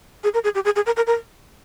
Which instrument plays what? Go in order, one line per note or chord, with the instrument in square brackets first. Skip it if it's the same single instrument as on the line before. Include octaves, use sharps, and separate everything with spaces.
[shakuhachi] G#4
A#4
G#4
G4
G#4
G#4
A#4
A#4
A#4